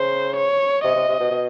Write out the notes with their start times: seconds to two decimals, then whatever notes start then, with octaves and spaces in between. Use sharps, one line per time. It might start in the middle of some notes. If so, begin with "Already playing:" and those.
Already playing: C#3 C5
0.37 C#5
0.84 C3 D#5
0.96 C3
1.09 C3
1.20 B2
1.32 B2